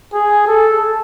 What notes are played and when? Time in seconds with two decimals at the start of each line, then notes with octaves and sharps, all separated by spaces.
0.14 G#4
0.47 A4